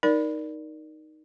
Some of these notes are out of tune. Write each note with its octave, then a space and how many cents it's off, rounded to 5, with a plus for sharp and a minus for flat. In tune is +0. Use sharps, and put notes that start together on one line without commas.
D#4 +0 A#4 +15 D5 +0